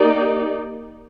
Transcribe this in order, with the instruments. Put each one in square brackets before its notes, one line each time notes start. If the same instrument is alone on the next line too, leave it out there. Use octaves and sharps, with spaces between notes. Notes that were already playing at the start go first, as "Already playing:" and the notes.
Already playing: [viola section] A#3 D#4 G4 D5